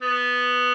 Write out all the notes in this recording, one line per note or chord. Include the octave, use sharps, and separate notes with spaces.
B3